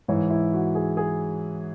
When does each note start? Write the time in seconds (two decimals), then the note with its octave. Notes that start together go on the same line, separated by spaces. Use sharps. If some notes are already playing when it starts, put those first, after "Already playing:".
0.08 G#2 E3 C#5
0.31 E4
0.53 F#4
0.75 G#4
0.97 G#4